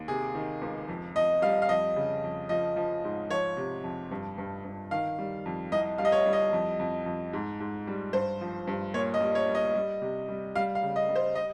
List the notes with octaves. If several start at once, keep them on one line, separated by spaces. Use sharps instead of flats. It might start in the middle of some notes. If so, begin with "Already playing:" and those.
Already playing: D#2
C3 G#4
D#3
C#2
F2
F2 D#5
G3 F5
F5
F2 D#5
C#3
F2
F3 D#5
F3
G#2
F3 C#5
C3
F2
G2
G2
G2
D#3 F5
G3
F2
C2 D#5
G3 F5
D#5
C#5
G3
D#5
F2
F2
F2
G#2
G#2
G3
G2 C5
F3
G2
A#2 C#5
D#5
G3
C#5
G3
D#5
G3
C3
G3
G3 F5
F5
C#3
D#5
G3
C5
D#5